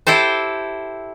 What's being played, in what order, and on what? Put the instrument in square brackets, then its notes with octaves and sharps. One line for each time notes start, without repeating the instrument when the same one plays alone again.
[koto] E4 G4 A4 C5